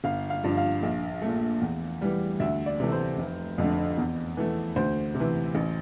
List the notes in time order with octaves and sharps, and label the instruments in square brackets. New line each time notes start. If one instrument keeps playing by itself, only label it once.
[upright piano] G1 F5
F5
G2 F3
F5
A#1
A#2 A3
E2
E3 G3
D2 E5
D5
C3 E3 A3
C5
F1
F2 D3 A3
E2
E3 A3
D2 C5
C3
E3
A1